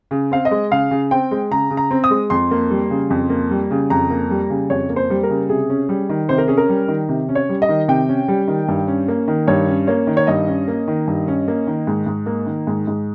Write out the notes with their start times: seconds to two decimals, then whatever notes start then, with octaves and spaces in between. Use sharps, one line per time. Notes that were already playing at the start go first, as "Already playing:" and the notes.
0.11 C#3
0.31 C4 F5
0.45 D#5
0.51 G#3
0.71 C#3 F5
0.91 C#3
1.11 C4 G5
1.31 G#3
1.51 C#3 A#5
1.71 C#3
1.77 A#5
1.91 C4
2.04 D#6
2.10 G#3
2.30 F2 C6
2.51 A#3
2.70 G3
2.90 C#3
3.10 F2
3.30 A#3
3.51 G3
3.71 C#3
3.90 F2 A#5
4.10 A#3
4.31 G3
4.50 C#3
4.70 F2 C#5
4.89 A#3
4.96 C5
5.10 G3
5.23 A#4
5.30 C#3
5.49 C3 G#4
5.70 C#4
5.89 G3
6.09 D#3
6.29 C3 C5
6.38 A#4
6.48 C#4 G#4
6.57 A#4
6.69 G3
6.88 D#3
7.09 C3
7.29 C#4
7.35 C#5
7.49 G3
7.62 D#5
7.69 D#3
7.88 C3 G5
8.09 C#4
8.28 G3
8.48 D#3
8.68 G2
8.88 C#4
9.08 A#3
9.28 D#3
9.47 G2 C#5
9.68 C#4
9.87 A#3 C#5
10.07 D#3
10.17 C#5
10.27 G2 D#5
10.48 C#4
10.68 A#3
10.88 D#3
11.08 G2
11.28 C#4
11.48 A#3
11.67 D#3
11.87 G#2
12.06 G#2
12.26 A#3
12.47 D#3
12.67 G#2
12.87 G#2